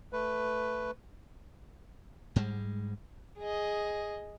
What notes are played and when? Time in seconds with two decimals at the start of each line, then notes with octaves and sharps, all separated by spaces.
0.13 A3 B4
2.36 G#2 G3 G#3
3.38 G#4 D#5